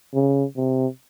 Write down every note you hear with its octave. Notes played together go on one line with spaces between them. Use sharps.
C#3
C3